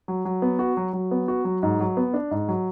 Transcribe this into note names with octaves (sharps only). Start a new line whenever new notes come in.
F#3
F#3
B3
F#4
F#3
F#3
B3
F#4
F#3
G#2
F#3
B3
D4
G#2
F#3